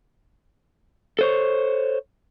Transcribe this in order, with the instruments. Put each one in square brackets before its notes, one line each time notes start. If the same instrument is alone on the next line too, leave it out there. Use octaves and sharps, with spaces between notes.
[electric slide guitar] A4 C5 C#5